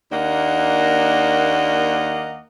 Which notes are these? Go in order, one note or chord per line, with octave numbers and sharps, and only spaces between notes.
D#2 A#3 D4 D#5 F#5